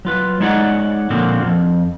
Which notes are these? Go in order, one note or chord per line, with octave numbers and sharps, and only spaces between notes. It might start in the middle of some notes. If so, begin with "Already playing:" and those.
F#3 F4 B4
G#3 D4 D#4 C#5 D5 F#5
A#2 D3 F3 A#3 C4 F#4
F2